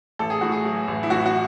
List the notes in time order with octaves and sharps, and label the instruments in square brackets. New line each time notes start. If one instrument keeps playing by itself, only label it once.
[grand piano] A1 A4
G#4
A2 F#4
G#4
F#3
A1
E4
A1 F#4
F#4